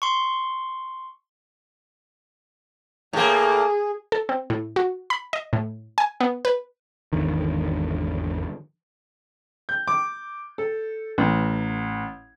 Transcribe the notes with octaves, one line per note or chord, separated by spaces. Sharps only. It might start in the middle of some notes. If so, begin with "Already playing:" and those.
C6 C#6
A2 A#3 G#4
A4
C4
A2
F#4
B5
D#5
A2
G#5
B3
B4
G#1 E2 D3 D#3
G6
D6
A4
A1